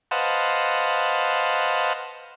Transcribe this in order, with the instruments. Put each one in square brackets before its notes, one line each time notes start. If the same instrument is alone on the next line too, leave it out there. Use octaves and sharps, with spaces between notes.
[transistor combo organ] B4 C5 D#5 F5 F#5 A5